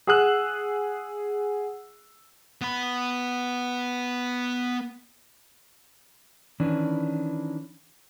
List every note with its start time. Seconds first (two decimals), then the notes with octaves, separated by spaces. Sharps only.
0.07 G#4 F#5 D#6 E6 F#6
2.61 B3 B5
6.60 D#3 E3 C#4 D4